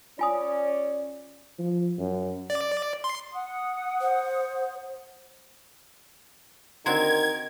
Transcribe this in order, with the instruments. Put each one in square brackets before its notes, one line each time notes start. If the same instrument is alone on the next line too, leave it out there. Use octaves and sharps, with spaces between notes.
[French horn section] C#4 D5 [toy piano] F4 G#5 D#6
[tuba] F3
F#2
[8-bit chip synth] D5
C6
[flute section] F#5 D#6
[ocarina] C5
[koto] D3 C4 F#4 [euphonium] D#3 [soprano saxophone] A#4 [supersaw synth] G#6